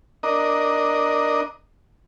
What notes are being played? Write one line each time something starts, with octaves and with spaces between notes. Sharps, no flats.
D4 A#4 D#5